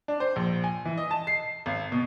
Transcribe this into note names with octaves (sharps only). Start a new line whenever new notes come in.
D4
C5
A#1
G#5
E3
D#5
A5
C7
G#1
B2